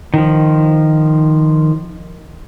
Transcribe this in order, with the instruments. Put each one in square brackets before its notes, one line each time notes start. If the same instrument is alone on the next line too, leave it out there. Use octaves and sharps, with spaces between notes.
[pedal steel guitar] D#3 F3